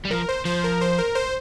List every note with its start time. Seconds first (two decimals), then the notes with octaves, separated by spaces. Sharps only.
0.05 G3
0.11 F3 A#4
0.29 C5
0.45 F3 C5
0.64 A#4
0.81 C5
0.98 A#4
1.15 C5